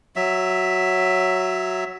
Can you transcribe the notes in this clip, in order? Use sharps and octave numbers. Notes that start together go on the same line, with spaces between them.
F#3 E5